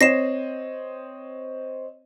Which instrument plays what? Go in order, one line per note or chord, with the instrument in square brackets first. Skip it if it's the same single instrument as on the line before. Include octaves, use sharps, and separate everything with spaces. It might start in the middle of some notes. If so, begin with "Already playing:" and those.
[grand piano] C4 C#5 D#5 [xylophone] A#6 C7 E7